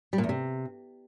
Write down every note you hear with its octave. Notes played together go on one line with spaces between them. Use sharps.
G3
A#2
E2
C3